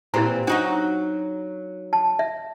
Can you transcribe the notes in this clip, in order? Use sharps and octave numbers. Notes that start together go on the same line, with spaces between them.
A#2 E3 C4 E4 G4 A#5
F#3 D4 D#4 F#4
A5
E5